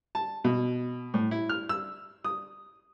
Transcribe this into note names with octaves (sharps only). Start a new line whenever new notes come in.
A5
B2
A2
E4
F6
E6
D#6